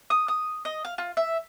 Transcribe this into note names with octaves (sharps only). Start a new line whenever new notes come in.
D#6
D#6
D#5
F5
F4
E5